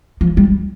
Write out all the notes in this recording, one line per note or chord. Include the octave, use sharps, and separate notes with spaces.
F3
G3